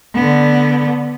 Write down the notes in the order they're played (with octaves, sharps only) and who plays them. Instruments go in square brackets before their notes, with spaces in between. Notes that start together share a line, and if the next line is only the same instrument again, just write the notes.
[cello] D3 B3